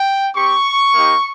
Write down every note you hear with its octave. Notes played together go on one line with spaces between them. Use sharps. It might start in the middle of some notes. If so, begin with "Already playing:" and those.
Already playing: G5
C4 G4 C#6
A#3 D#4 G4